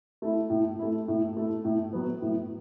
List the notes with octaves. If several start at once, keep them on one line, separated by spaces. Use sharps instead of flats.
A3 E4
A2
A3 E4
A2
A3 E4
A2
F#3 B3
A2